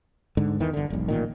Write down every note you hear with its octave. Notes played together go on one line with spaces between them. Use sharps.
G#2 D3
E2 D#3 E3
G1 D3
E1 B1
A1 A#2 D#3